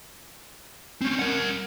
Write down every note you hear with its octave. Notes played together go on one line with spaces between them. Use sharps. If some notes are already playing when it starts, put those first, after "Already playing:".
C4 C#4
A#4 F#5